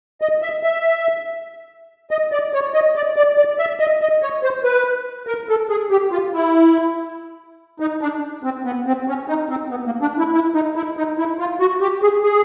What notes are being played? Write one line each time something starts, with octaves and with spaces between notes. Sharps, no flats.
D#5
E5
E5
D#5
D5
C#5
D#5
D5
D5
D5
E5
D#5
D#5
C#5
C5
B4
A#4
A4
G#4
G4
F4
E4
D#4
D4
C4
B3
C4
C#4
D#4
C4
B3
A#3
D4
E4
E4
D#4
E4
D#4
E4
F4
F#4
G4
G#4
G#4